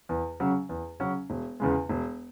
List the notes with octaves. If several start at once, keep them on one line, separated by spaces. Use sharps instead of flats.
E2
C#3 F#3 C#4
E2
C#3 F#3 C#4
E1
E2 C#3 G#3
E1